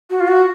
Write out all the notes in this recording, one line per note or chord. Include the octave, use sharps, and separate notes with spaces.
F#4
F4
F#4